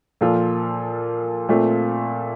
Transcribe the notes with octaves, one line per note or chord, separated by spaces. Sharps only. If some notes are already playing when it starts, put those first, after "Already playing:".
A#2 F3 A#3 F4 A4
A#2 A3 C4 F4